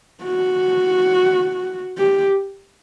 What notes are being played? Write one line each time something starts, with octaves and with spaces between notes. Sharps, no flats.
F#4
G4